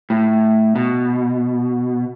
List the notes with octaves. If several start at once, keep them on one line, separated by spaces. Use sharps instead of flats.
A2
B2